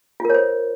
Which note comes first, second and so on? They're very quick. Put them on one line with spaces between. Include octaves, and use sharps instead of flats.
F4 A#4 C#5 C5